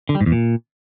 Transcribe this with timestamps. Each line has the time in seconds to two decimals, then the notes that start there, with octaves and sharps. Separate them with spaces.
0.09 D3
0.15 G3
0.21 G#2
0.26 E2
0.32 A#2